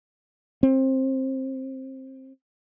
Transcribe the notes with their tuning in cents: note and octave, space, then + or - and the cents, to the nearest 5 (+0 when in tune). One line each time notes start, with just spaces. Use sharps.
C4 +20